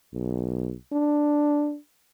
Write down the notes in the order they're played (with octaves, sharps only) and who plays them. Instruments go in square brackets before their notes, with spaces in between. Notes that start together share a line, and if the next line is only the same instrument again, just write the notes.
[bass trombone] B1
D4